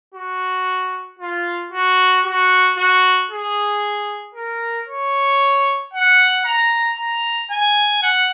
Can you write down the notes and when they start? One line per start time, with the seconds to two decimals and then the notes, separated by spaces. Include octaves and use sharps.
0.14 F#4
1.19 F4
1.72 F#4
2.25 F#4
2.78 F#4
3.31 G#4
4.35 A#4
4.88 C#5
5.94 F#5
6.45 A#5
6.98 A#5
7.51 G#5
8.03 F#5